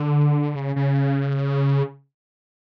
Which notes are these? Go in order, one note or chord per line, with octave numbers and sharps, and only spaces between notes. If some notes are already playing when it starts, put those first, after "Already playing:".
Already playing: D3
C#3
C#3